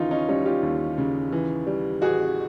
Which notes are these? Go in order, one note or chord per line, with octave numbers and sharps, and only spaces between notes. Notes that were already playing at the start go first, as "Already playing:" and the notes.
Already playing: D#2 C#3 E3 D#4 F4
C#4 D#4
G3 C#4 D#4
F4 G4
D#2
C#3
E3
G3
A1 F#4 G#4